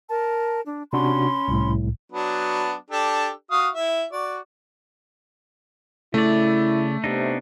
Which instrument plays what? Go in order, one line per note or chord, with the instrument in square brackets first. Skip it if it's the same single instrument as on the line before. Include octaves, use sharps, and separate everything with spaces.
[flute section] A#4 A5
D4
[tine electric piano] C3 D4 F#4 [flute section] C#4 B5 C6
[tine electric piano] C2 A2
[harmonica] F#3 B3 D4
D4 G4 A4
F#4 F5 D#6
E4 E5
F#4 D5
[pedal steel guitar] C#3 D5 [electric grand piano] A3 [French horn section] E4
[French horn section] C3 [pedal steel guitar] B3 D4 D#4